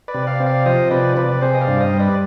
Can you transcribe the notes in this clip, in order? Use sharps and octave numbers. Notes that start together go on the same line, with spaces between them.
B4 D5
C3
D5 F5
C4
D5 F5
F3 C5 D#5
C3 B4 D5
C3 B4 D5
D5
C4 G#4 C5
D#5
D5 F5
G2
C5 D#5
G3
B4 D5